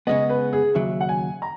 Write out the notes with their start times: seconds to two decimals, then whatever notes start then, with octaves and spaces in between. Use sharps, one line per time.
0.07 C#3 G#3 B3 D#5
0.29 B4
0.53 G#4
0.74 D#2 C#3 F#3 E5
1.00 F#5
1.09 G#5
1.42 A#5